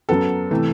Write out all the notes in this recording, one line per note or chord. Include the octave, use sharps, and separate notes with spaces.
F#2 F#3 B3 A4
C3 E3 A3